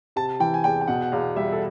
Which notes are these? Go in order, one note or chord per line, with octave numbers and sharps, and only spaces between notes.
C3 A5
E3 G5
G#5
E2 G5
G5
B2 F#5
F#5
E2 F5
G3 E5
A4